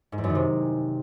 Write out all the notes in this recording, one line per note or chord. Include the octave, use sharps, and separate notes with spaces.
G#2
E2
F#2
D#3
C3